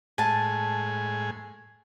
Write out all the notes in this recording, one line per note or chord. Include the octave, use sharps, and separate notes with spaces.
A2 G#3 G#4 G#5 A5